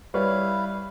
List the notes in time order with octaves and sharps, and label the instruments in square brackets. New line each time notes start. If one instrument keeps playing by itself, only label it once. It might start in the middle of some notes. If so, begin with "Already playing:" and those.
[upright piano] G3 B4 C#5 [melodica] E4 F5